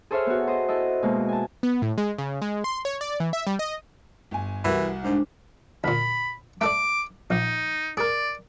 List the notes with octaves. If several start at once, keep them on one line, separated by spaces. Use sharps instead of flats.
G#4 A4 C5 C#5 E5 F6
B3 F#4
C5 D#5
E4 A4 D#5
B2 G#3 A#3
G#5 A5
B3
A2
G#3
C#3
G#3
C6
C#5
D5
E3
E5
G3
D#5
G1 G#5
C2 E3 F#4 A#4
G#2 G#3 D4 C5
D2 A#2 B5
A3 A4 D5 D6
A#1 D#4
G#4 A#4 D5